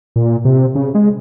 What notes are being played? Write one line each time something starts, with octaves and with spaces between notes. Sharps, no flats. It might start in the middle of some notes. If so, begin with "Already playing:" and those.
A#2
C3
C#3
G#3